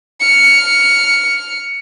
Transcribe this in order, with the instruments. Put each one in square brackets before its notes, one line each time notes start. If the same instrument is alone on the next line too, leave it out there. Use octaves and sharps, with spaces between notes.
[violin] F6 C#7